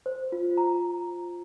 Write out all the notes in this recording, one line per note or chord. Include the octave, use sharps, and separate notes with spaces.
C5
F4
A#5